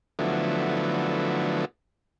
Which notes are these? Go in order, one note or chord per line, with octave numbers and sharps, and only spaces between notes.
D3 F3 F#3 A3 B3 E4